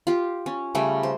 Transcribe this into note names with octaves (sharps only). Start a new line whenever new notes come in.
F4 G4
C#4
C#3 G3 A3 G#4
C5